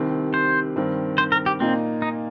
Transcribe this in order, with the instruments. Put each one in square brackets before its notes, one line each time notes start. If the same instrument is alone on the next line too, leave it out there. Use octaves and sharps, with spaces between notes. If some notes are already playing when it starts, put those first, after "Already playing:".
Already playing: [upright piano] C2 C3 D#3 C4
[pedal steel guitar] C5
[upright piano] G2 D#3 C4
[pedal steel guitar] C5
A#4
G4
[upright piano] A#2 A#3 D#4 [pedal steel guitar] C4
[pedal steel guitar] D#4